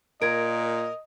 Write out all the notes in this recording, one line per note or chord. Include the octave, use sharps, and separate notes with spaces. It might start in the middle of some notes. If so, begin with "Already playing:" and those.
A#2 A#4 D#5 G#6 D7